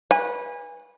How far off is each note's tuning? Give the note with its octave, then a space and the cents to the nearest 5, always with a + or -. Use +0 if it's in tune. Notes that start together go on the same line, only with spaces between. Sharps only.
B4 -20 G#5 -30